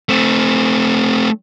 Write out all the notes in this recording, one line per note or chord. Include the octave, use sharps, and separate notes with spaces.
A3 C4